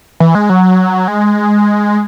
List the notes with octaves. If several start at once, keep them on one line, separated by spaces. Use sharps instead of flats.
E3
G#3
F#3
G#3